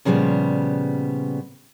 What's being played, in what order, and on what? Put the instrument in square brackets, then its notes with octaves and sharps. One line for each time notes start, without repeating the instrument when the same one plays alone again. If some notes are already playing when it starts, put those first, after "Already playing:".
[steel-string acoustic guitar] A#2 C#3 F3 G3 B3